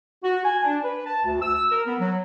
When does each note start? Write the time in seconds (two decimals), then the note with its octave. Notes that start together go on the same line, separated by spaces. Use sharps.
0.24 F#4
0.45 G#5
0.64 D4
0.84 B4
1.06 A5
1.26 D2
1.42 E6
1.71 A#4
1.86 B3
1.99 F#3